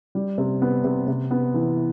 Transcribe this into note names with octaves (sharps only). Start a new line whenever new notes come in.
G3
C3
B3
C3
C3
B3
E3